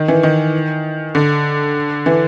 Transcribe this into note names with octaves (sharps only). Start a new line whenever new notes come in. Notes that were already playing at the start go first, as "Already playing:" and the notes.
Already playing: D#3
E3
D#3
D3
E3